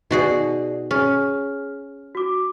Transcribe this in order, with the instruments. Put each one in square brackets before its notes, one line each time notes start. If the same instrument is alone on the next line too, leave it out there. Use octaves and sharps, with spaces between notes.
[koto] B2 F#4 G#4 [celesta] D#4 D5
[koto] C#4 [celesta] G#4 F6
[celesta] F#4 D6